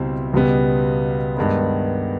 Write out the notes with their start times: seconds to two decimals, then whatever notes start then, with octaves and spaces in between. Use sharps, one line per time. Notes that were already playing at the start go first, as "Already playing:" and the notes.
Already playing: C#2 B2 G3 C4 E4
0.33 C#2 B2 G3 B3
1.37 G2 D#3 G#3 B3